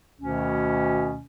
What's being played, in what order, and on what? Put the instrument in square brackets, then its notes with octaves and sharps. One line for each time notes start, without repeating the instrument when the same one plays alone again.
[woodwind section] D2 B2 D#3 C#4